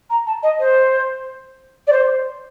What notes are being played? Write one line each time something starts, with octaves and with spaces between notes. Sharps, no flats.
A#5
A5
D#5
C5
D5
C5